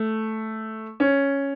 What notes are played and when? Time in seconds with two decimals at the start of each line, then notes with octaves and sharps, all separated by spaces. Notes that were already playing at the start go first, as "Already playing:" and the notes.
Already playing: A3
1.00 C#4